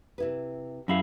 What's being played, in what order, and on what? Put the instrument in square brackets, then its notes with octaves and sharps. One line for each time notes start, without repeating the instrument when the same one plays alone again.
[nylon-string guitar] C3 E4 B4
[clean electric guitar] F#2 E4 F5 [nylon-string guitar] C#4 G#4 A#4